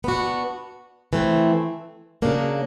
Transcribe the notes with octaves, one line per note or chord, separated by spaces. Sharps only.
B3 D4 F#4
E3 A3 C4
C#3 F#3 A#3 D4